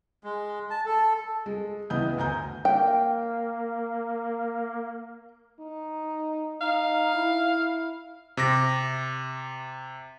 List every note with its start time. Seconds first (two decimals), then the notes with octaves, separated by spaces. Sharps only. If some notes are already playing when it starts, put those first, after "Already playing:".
0.24 G#3
0.70 A5
0.86 A4
1.46 G#3
1.90 C#2 E3 B3 D#5 D#6 G6
2.17 D2 G#5 A#5 G6
2.65 A#3 G5
5.60 D#4
6.61 D#4 F5
7.15 E4
8.37 C3 D6 A#6